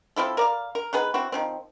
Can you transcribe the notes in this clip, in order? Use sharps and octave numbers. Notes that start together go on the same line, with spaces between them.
F3 C4 E4 A4
A#4 D5 F5
A#4
D#3 B3 G#4 B4
C4 E4 F#4
D#3 F3 C4